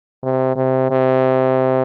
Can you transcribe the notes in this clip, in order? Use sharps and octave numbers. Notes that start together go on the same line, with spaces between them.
C3
C3
C3